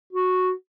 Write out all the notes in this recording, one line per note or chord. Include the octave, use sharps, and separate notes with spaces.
F#4